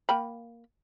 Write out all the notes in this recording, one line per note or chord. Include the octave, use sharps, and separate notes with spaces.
A#3 G5 B5